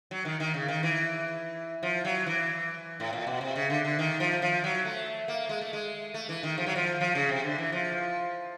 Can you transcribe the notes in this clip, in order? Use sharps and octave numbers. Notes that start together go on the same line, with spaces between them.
F#3
D#3
D#3
C#3
D#3
E3
F3
F#3
E3
A2
A#2
B2
C3
C#3
D3
D3
D#3
F3
F3
F#3
A3
A#3
G#3
A3
G#3
A3
E3
D#3
F3
F#3
F3
F3
C#3
C3
D3
E3
F3